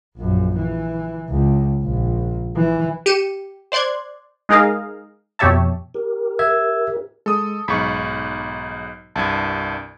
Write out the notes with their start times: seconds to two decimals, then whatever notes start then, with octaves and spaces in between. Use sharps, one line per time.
0.17 A#1 F#2
0.58 E3
1.29 C#2
1.82 A#1
2.56 E3
3.06 G4 C#7 D#7 E7
3.72 C5 D5 C6 F#6 G#6
4.49 G#3 D#4 G#4 A#4 D#5 F5
5.39 F2 B2 G4 C#5 E5 A5
5.94 G4 A#4
6.39 E5 E6 G#6
7.26 G#3 A4 D#6
7.68 B1 G#2 B5 C#6
9.16 C2 G2 A5 G#6